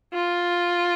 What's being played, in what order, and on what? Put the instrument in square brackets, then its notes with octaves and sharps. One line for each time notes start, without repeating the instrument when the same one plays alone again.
[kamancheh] F4